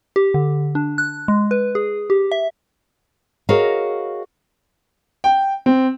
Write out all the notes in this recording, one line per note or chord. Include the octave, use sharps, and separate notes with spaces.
G4
D3
D4
F#6
G#3
B4
G#4
G4
E5
F#4 G#4 A#4 C#5 D#5 F5
G5
C4